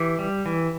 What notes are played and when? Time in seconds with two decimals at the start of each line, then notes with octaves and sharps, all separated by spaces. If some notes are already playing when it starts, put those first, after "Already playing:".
Already playing: E3 G4
0.19 G3
0.46 E3